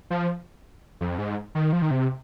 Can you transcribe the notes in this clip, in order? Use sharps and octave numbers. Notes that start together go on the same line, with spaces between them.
F3
F2
G#2
D#3
F3
D#3
C3